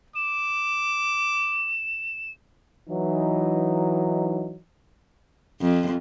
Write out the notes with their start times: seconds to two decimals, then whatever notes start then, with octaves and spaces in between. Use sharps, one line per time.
0.15 D6 E7
2.89 E3 F#3 D#4
5.61 F2